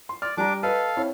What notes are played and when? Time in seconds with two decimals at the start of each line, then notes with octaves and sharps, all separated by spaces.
0.09 C6
0.22 D5 F6
0.37 G3 D4 G4 A#5 D6
0.63 A4 B4 D#5 F5
0.96 C4 E4 C#5